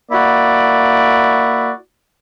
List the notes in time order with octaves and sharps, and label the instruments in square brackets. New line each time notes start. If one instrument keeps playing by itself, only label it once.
[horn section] A#3 E4 F#4 D5